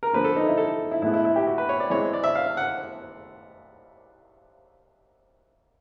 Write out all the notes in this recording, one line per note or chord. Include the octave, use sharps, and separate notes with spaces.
A#4
D3 F3 A#3 B4
A4
D#4
E4
A4
E4
A2 E3 G#3 B3 E4
E4
E4
G4
F#4
B4
C#5
D5
E3 G#3 C4 C#5
D5
E5
F5
F#5